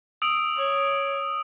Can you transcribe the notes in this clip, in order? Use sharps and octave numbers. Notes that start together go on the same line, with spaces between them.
D#6 E6 D7
C#5